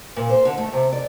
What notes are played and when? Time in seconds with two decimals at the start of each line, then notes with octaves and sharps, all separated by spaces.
0.16 A#2
0.29 C5
0.45 D3
0.58 A3
0.72 C3
0.92 D5